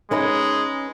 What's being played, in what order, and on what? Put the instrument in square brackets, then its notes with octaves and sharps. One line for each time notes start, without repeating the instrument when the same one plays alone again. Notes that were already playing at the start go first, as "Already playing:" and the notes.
[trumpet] G#3 [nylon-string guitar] C#4 D#4 B4